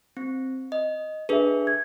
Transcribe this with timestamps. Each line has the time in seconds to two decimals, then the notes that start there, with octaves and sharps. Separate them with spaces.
0.17 C4
0.72 D#5
1.29 D4 G#4 A4 B4 E5
1.67 G#6